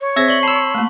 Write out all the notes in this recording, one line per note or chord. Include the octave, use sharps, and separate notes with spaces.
C#5
C4 G#4 C5 E5 G#6 A#6 B6
D5 C#6 F#7 G7
A5 B5 C6 E6 C7
A3 A#3